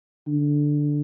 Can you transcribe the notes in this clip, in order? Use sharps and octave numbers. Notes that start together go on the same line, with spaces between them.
D3